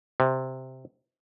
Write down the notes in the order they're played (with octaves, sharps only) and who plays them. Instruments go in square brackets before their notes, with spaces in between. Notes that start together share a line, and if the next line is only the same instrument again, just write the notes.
[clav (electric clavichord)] C3